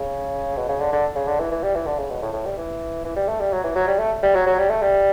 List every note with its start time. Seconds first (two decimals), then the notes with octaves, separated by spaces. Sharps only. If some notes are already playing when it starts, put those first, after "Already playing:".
Already playing: C#3
0.57 B2
0.69 C#3
0.80 D3
0.92 D3
1.15 C#3
1.28 D3
1.39 E3
1.51 E3
1.63 G3
1.75 E3
1.87 D3
1.98 C#3
2.10 B2
2.22 A2
2.33 A2
2.46 G3
2.57 E3
3.04 E3
3.16 G3
3.28 A3
3.40 G3
3.52 F#3
3.64 E3
3.75 F#3
3.87 G3
3.99 A3
4.23 G3
4.34 F#3
4.46 F#3
4.58 G3
4.70 A3
4.82 G3